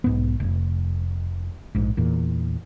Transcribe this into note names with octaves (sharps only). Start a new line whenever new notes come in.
B1 G#2 B3
F1
A#1 G#2
E2 A#2